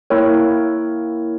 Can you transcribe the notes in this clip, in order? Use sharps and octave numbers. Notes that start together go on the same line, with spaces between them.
A#3 E4 A#4 C#5 G5